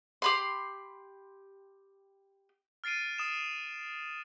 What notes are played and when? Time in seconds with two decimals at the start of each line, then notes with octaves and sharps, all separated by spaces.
0.22 G4 B5 C6
2.84 F6 A6 C7 D7 D#7
3.18 D#6 E7